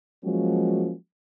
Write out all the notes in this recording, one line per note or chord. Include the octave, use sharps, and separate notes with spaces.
F3 F#3 G#3 A#3 C#4 F#4